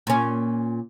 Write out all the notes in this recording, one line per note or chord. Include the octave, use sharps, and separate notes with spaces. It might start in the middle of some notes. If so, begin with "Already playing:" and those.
A#2 C#4